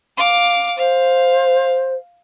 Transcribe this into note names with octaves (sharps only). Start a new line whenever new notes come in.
F5 D6
C5 F5